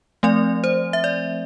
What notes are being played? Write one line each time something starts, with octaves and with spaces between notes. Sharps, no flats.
F3 A3 C4 D5
C5
E5
D5